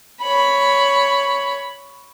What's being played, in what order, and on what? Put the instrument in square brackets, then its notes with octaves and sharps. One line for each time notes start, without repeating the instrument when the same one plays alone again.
[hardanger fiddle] C#5 B5